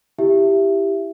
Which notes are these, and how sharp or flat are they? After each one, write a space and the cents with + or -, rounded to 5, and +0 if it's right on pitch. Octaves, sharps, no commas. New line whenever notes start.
E4 +0 G4 +0 E5 +15